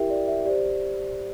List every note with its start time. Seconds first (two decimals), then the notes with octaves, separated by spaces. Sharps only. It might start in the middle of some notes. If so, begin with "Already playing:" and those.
Already playing: E4 G4 A#4 E5 G5
0.10 D5
0.28 E5
0.46 G4 C5 D5